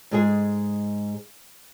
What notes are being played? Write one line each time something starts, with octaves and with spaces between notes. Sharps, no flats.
G#2 G#3 G#4